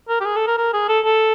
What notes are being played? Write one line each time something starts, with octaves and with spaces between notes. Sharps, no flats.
A#4
G4
G#4
A4
A#4
A#4
G#4
A4
A4